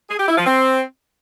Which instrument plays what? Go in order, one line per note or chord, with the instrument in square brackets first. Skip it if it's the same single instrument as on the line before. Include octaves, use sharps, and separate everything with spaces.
[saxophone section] G#4
G4
E4
F3
C4